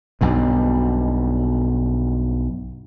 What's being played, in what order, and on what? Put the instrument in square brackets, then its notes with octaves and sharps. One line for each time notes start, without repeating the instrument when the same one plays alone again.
[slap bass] B1 G2 B2